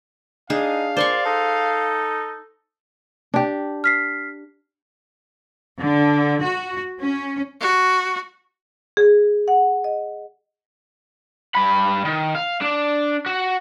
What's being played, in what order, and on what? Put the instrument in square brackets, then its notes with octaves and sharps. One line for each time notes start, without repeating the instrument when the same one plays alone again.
[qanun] D4 G#4 [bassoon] D#4 [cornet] F5
[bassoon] A#2 [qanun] C5 C6 C#6 [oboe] D5
[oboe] D#4 [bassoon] A4
[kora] D4 G4
[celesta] F6 B6 C7
[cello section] D3
F#4
C#4
[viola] F#4
[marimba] G#4
F#5
D#5
[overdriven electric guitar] G2 B5
D#3
F5
D4
F#4